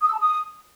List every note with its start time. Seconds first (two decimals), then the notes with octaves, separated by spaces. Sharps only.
0.01 D#6
0.07 E6
0.13 A5
0.19 D#6